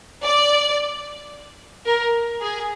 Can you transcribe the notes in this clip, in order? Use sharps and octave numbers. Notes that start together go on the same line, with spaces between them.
D5
A#4
G#4